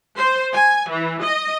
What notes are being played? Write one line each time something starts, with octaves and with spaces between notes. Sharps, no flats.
C5
G#5
E3
D#5